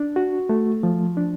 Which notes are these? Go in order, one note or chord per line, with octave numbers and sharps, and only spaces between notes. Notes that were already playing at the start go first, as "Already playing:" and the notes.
Already playing: D4
F#4
A3
F3
D4